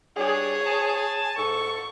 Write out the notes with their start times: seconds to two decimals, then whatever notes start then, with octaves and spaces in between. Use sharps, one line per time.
0.17 G3 D4 G#4 C#5
0.66 G#5 A5
1.37 G#2 A4 C#6